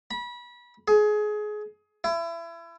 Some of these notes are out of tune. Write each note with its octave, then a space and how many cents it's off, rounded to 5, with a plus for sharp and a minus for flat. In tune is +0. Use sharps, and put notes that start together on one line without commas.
B5 -30
G#4 +25
E4 +30